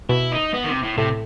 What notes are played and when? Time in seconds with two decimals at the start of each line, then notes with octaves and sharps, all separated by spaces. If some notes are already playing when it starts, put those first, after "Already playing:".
0.09 B2 B3 E4
0.32 D#4
0.54 B3
0.64 D#3
0.68 C3
0.83 A2
0.97 A2 C3 A3